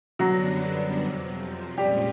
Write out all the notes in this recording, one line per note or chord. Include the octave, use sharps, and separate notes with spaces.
F#2 D3 F#3 G3 B3 D4 F#4
F2 C3 F3
A#2 F3 G3 G#3 C#4 G4